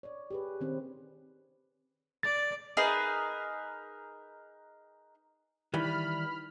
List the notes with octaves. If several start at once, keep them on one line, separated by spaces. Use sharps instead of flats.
C#5 D5
G4 G#4 B4
D#3 C4 C#4 D#4
D5 A6
D#4 G#4 A#4 B4
D#3 E3 G3 B5 F6